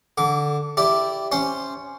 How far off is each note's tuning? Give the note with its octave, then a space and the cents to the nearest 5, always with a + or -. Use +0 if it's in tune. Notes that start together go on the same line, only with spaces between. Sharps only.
D3 +0 D6 -30
E4 +5 G4 +0 D5 -10
C#4 +0 C5 +0